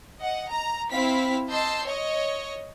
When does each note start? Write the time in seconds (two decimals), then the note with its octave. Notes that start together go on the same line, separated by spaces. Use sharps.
0.19 D#5 F#5
0.49 A#5
0.91 C4 E4 F5 B6
1.50 D#5 A5 C6 E6 G6 C7
1.84 C#5 D#5